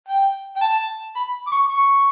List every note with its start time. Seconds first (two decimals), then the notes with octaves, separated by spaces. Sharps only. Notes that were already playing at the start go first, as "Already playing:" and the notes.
0.08 G5
0.56 G5
0.61 A5
1.16 B5
1.47 D6
1.52 C#6
1.70 C#6